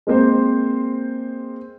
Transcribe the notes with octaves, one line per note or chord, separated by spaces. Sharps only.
G#3 A#3 C4 C5